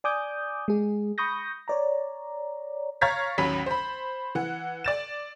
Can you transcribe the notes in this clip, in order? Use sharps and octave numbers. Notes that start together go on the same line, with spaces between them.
D5 G#5 D6 D#6 G6
G#3 G#4
B5 C#6 D#6 G6 A#6
C#5 D5 A#5
C#5 F5 A#5 G#6 A6 B6
A1 D#2 F#3 C#4 B5 B6
C5 B5
E3 F#5
D5 A6 E7